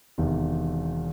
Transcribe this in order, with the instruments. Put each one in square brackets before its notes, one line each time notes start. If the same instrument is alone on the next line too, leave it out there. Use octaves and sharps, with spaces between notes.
[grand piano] E1 E2 C3 D#3